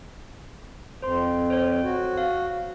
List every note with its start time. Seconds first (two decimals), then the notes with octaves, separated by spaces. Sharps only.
1.02 F2 C5 C6
1.50 C5 C#5
1.84 F#4
2.17 F5